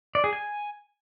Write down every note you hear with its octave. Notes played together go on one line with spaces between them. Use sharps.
D5
G#4
G#5